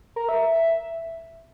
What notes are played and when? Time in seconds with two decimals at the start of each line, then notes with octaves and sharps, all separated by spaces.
0.16 A#4
0.29 E5